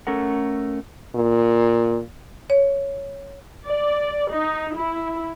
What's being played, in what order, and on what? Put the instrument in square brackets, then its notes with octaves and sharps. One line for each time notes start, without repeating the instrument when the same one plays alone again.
[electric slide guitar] A3 C#4 A4 A#4 F#5
[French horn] A#2
[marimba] C#5
[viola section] D5
D#4
E4